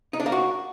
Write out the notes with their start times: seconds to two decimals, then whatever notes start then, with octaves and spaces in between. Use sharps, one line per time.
0.13 D#4
0.20 D4
0.26 A#3
0.32 F#4